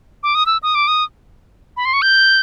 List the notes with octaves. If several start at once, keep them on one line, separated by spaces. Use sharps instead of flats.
D6
D#6
E6
D#6
D6
D#6
B5
C6
C#6
G6